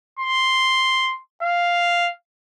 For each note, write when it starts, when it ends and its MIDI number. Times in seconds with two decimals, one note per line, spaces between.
0.19 1.16 84
1.43 2.11 77